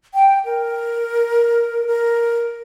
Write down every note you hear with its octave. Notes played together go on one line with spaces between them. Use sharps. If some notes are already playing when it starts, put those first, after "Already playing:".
G5
A#4
A#4